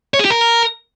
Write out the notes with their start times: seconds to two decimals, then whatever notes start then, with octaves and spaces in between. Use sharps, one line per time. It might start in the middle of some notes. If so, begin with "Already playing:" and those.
0.14 C#5
0.19 G#4
0.25 G4
0.30 A#4